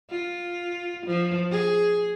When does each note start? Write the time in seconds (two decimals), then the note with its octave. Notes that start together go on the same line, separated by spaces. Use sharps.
0.11 F4
1.06 F3
1.52 G#4